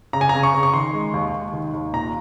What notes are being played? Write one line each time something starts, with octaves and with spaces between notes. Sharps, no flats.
C#3 A#5
G#5
C#3 A#5
C#6
C#3
C#6
D#3 C6
G#3
D#2
D#2
D#3
D#2
A#2 A#5